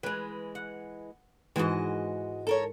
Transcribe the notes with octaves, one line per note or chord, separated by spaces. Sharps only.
E3 G#3 B4
F#5
G#2 E3 G#3 F#4 D#5
A4 A#4 C#5